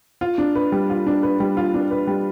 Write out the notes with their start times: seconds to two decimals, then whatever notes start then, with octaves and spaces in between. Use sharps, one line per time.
0.21 F4
0.38 D4
0.55 B4
0.72 G3
0.90 F4
1.07 D4
1.23 B4
1.40 G3
1.57 F4
1.74 D4
1.91 B4
2.07 G3